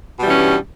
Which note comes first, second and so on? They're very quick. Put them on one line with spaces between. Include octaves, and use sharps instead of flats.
B2 G3 E3 C#4 G2